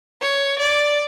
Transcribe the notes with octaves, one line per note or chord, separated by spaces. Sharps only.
C#5
D5